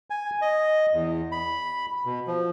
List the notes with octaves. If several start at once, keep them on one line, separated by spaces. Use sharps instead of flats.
G#5
D#5
E2
B5
B2
F3